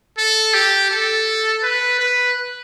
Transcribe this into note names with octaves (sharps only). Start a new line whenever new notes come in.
A4
G4
A4
B4
B4